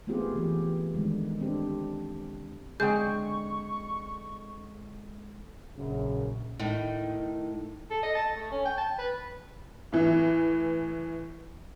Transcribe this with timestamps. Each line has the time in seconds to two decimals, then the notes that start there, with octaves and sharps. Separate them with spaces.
0.07 A3 B3 C4 F4 G4 G#4
0.35 E3 G4
0.93 D3 D#3 G3 G#3
1.41 C4 D4 G4
2.80 D3 G#3 C4 G#4 G5 C#6 G6
5.76 A#1 F#2 C#3
6.59 A2 D#3
7.90 A4
8.03 D#5
8.15 A5
8.36 A3
8.51 C#4
8.65 G5
8.77 A5
8.98 B4
9.92 A2 E3